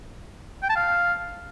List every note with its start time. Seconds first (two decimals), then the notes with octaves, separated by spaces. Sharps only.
0.63 G5
0.70 A5
0.76 F5